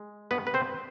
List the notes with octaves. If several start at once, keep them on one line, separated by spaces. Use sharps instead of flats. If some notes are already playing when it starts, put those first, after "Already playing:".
Already playing: G#3
G2 B3 B4
B4
C4 C5